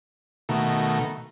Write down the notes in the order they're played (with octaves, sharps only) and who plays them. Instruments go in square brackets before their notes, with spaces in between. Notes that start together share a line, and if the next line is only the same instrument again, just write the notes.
[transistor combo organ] B2 D#3 A3